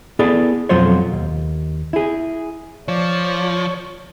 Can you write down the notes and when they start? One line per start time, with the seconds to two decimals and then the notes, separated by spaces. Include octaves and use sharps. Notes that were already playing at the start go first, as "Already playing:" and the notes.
0.19 B3 E4 G#4 A4 D5
0.69 B1 F2 F#3 F4 C5 C#5
1.12 D#2
1.93 E4 G#4
2.88 F3 C#5 D5